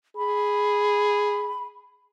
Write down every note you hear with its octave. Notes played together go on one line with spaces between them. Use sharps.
G#4 B5